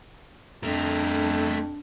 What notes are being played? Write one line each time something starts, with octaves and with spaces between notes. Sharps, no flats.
F2 A3 D4 A#4